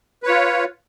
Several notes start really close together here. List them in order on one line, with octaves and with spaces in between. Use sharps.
B4 C#5 F4